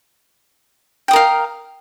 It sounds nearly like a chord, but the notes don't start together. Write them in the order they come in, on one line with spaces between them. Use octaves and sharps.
G5 D#6 A#4 F5